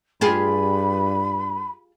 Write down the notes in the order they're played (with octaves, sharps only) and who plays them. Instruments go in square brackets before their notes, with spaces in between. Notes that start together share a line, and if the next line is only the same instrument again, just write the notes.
[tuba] G2 [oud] F4 G4 G#4 [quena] B5